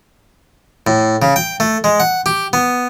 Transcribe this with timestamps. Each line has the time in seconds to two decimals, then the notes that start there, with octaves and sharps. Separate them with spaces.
0.87 A2
1.22 C#3
1.36 G5
1.60 A3
1.84 G#3
2.00 F#5
2.26 G4
2.53 B3